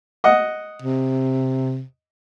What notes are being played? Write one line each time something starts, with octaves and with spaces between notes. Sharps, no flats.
D#5 F#5 D#6
C3